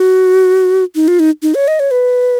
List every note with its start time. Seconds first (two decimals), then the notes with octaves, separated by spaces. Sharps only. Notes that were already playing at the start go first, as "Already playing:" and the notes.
Already playing: F#4
0.95 D#4
1.08 F4
1.19 D#4
1.43 D#4
1.55 C#5
1.68 D#5
1.80 C#5
1.91 B4